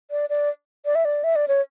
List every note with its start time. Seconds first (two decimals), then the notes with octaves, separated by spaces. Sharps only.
0.11 D5
0.30 D5
0.85 D5
0.95 E5
1.05 D5
1.24 E5
1.36 D5
1.48 C#5